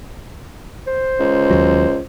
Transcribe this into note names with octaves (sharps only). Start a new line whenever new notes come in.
C5
C#2
D#2 F#3